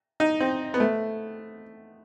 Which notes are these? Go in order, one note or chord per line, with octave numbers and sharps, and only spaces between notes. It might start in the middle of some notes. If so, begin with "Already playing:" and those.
D#4
C4
B3
A3